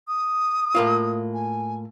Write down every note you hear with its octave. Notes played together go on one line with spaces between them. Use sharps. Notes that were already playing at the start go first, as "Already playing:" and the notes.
D#6
A2 A#3 F4
G#5